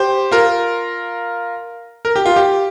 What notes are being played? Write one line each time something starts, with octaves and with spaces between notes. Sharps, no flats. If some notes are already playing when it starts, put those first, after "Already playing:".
Already playing: G4 C5
F4 A#4
A#4
G4
F4
G4